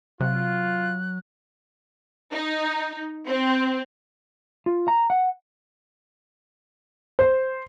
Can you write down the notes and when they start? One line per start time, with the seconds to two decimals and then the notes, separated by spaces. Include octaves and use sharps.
0.21 C3 F#3 F4 F#6
2.30 D#4
3.26 C4
4.66 F4
4.88 A#5
5.10 F#5
7.19 C5